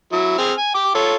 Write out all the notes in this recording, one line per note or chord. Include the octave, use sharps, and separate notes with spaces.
F#3 E4
C4 G#4 F6
G#5
G5 D6
F4 A4 C#5